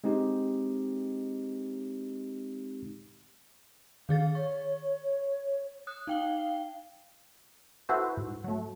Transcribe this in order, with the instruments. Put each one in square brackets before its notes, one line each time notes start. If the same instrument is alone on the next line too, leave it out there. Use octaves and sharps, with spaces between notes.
[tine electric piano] G#3 C4 D#4 G4
[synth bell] D#3 G#4 A6 [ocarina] F5
[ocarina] C#5 [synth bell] C#6
[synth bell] D#6 F#6
[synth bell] D#4 G5 G7 [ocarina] F5
[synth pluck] E4 F#4 A4 B4 C5
G#2
F#3 A3